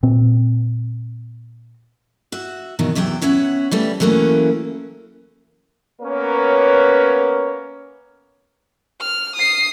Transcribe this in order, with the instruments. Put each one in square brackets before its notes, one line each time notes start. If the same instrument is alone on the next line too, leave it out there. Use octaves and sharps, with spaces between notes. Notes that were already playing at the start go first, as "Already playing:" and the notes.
[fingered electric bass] A#2 C4
[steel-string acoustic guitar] F#4 E5
B2 D#3 E3 F#3
E2 C3 F#3 E5 G5
B3 C#4 C#5 E5 F#5
E3 G3 A3
E3 F#3 A3 A#3 C#4
[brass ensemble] A#3 B3 C#4 A#4 B4 C#5
[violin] F6
D#6 C7